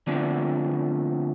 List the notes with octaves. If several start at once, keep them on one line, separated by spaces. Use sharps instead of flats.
D3 F3 A3 B3 C4 D5